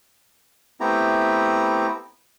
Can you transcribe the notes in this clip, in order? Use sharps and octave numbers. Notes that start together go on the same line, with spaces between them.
A3 B3 C4 E4 G4 A#5